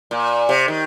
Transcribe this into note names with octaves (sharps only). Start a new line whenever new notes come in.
A#2
C3
D#3